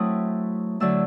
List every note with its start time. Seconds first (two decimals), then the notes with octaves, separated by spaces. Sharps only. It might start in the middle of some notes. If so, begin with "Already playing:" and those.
Already playing: F#3 A3 C4 E4 D#6
0.80 D3 F#3 A3 E6